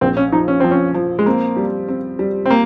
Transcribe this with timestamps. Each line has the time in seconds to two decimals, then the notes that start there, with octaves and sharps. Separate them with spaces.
0.01 A#1 C4
0.17 C#4
0.32 F3 D#4
0.48 C#4
0.60 F3 C4
0.71 C#4
0.94 F3
1.19 G#3
1.26 A#3 C4
1.57 G3
1.88 C4
2.19 G3
2.46 C4
2.50 A#3